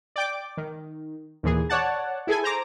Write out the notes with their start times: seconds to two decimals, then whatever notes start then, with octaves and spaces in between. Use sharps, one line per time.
0.16 D5 G5 D6
0.57 D#3
1.43 D#2 A#2 E3 G#4
1.70 C#5 D5 F#5 A5
2.27 E4 G#4 A4 G#5
2.43 C5 A#5 D6